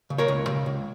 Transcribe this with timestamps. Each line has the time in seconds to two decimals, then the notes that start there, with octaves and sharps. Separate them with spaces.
0.10 C#3
0.18 A#4 C#5
0.28 C#2
0.47 C#3
0.66 C#2